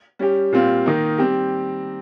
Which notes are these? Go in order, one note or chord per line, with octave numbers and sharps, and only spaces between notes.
G3 C#4 G4
A#2 G3 C4 F4
D#3 A#3 D#4
G3 C4 G4